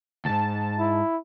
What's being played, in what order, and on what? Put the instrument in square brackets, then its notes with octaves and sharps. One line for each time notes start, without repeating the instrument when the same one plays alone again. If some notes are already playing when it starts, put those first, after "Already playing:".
[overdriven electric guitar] D2 G#2 [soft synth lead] A5
[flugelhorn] E4